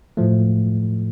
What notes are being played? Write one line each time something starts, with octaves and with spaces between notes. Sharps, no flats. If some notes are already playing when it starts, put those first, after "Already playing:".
A2 F3 A3